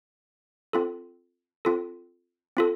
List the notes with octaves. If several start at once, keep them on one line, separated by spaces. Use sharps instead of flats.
C4 F4 A4
C4 F4 A4
C4 F4 A4